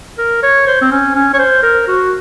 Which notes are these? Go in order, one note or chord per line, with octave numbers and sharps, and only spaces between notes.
A#4
C#5
C5
C4
C#4
C#4
C#5
C5
A#4
F#4